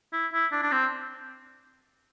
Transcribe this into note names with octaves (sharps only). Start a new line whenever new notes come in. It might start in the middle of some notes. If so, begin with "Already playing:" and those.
E4
E4
D4
D4
C4